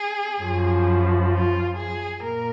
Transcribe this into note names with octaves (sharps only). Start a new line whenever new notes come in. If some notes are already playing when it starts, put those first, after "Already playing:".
Already playing: G#4
F#2 F3
F4
G#4
A#2 A#4